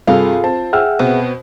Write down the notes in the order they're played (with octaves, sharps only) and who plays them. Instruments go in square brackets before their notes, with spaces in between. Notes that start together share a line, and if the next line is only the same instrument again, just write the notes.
[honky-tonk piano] G2 C3 [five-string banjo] F4 [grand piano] G#4 A4 F5
[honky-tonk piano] C4 [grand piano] A5
[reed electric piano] G#4 E5 F#5 [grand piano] G5 E6 F6
[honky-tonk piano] B2 C4 [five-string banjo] B3